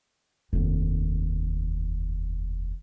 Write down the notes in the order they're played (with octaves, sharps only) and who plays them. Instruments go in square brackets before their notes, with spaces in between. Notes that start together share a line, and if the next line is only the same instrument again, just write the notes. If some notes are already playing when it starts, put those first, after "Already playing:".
[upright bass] F1 D#2